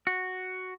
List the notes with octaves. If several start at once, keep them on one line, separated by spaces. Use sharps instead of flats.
F#4